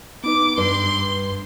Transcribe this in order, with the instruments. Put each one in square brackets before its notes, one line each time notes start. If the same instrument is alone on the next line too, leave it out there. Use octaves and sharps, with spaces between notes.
[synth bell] B3 D#4 B4 [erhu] D6
[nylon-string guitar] G2 [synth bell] B4 [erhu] C6